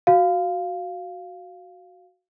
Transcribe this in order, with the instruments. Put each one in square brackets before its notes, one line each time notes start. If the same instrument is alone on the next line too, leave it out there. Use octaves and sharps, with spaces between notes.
[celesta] F#4 F5